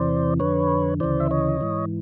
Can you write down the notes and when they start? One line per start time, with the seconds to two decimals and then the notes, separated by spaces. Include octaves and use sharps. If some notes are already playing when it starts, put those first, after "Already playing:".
Already playing: E2 C3 E3 C5 D5
0.40 F2 D3 B4 C#5
1.00 D2 C#3 E3 C5 D5
1.20 E5
1.31 C#5 D#5
1.61 G#2 E3